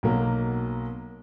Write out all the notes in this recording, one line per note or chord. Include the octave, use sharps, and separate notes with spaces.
B1 B2 F#3 A#3